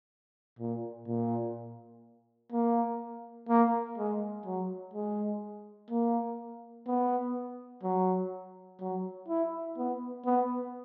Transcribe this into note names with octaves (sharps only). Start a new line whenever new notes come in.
A#2
A#2
A#3
A#3
G#3
F#3
G#3
A#3
B3
F#3
F#3
E4
B3
B3